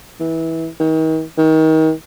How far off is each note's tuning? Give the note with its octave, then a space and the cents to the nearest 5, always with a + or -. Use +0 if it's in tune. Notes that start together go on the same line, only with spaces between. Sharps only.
E3 -20
D#3 +40
D#3 +30